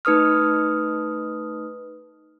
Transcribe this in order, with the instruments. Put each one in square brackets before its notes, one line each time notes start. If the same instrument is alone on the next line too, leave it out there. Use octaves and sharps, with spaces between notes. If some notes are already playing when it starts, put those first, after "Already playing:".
[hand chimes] A3 D#4 B4 D#6 F6